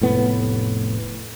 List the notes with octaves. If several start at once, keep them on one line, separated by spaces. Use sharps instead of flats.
F1 A2 B3